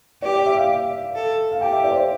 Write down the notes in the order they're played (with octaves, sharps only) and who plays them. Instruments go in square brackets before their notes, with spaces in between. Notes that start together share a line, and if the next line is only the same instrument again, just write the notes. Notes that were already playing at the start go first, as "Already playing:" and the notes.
[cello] G4 [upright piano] D5
[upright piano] D5
E5
F5
[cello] A4
[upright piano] F5
[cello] G4 [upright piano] G5
[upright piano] E5
D5
C5
D5